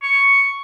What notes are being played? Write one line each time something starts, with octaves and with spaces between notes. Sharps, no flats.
C#6